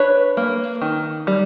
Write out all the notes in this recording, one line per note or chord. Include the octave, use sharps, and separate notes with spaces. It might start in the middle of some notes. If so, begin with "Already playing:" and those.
Already playing: D4 B4 C#5
A#3
D#3
G3